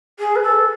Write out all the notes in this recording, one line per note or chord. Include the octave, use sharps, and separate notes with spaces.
G#4
B4
A4